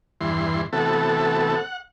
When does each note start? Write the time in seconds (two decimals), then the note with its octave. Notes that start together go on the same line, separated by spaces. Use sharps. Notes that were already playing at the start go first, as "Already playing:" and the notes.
0.21 E2 G2 E3 C6
0.73 C3 E3 A3 B3 F#4 A4
1.56 F#5